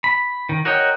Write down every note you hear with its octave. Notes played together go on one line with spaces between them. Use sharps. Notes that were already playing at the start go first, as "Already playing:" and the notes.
B5
D#3
F#4 A#4 C#5 D#5 G5